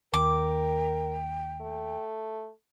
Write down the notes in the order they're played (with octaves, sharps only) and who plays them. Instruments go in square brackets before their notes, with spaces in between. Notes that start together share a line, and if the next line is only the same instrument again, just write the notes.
[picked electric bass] D#2 [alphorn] A#4 [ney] G5 [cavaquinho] D6
[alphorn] A3